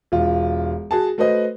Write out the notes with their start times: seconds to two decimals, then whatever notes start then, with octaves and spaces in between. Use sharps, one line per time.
0.12 E1 F4
0.91 F#4 G#4 A5
1.18 A3 F#4 B4 C5 D#5